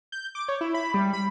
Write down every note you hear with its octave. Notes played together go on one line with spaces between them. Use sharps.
G6
D6
C#5
E4
B5
G3
B5